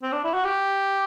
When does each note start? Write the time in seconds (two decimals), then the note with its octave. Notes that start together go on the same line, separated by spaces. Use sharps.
0.03 C4
0.12 D4
0.24 E4
0.34 F#4
0.45 G4